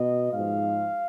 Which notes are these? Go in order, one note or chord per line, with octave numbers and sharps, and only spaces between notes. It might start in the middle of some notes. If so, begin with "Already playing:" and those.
Already playing: B2 D#5
G#2 F3 F5